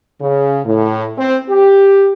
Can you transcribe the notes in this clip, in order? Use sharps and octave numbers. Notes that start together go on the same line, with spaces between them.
C#3
A2
C4
G4